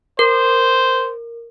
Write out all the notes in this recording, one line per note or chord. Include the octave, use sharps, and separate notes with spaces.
A#4 C5